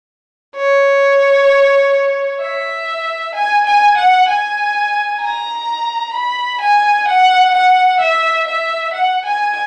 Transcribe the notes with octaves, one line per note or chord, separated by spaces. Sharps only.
C#5
E5
G#5
G#5
F#5
G#5
A#5
B5
G#5
F#5
F#5
E5
E5
F#5
G#5